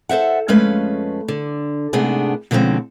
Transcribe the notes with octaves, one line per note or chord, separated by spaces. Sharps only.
A4 C5 E5 F#5
F2 G#3 A3 C#4 B4 F5
D3
G#2 C3 A3 B3 D4 G#4
B2 D3 F3 G#3 C4 C#4